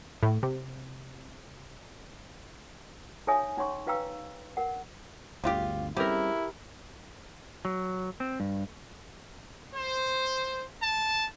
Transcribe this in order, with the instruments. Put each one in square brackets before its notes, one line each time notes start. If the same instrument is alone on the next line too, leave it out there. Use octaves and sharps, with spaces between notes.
[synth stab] A2
C3
[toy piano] D#4 A4 C#5 E5 G#5 D#6
C#4 D#4 C#5 C6 C#6
D#4 B4 F5 G5 A#5 E6
A#4 F#5
[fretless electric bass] G1 D2 [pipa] C#3 F4 G4
[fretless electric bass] G3 C4 C#4 [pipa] G#3 [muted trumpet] E4 [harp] G4 A#4
[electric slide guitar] F#3
C4
G2
[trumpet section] C5
A5